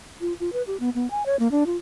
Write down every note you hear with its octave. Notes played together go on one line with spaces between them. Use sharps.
F4
F4
B4
G4
B3
B3
G#5
C#5
A#3
D4
F4